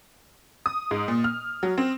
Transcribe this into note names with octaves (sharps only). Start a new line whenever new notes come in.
D#6
G#2
A#2
F6
F#3
C4